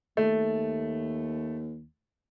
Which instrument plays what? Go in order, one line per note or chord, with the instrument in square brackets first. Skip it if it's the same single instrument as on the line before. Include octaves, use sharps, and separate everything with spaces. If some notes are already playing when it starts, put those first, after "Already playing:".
[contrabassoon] D#2 [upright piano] A3